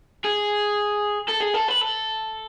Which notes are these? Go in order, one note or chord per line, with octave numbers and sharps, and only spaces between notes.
G#4
A4
G#4
A4
B4
A4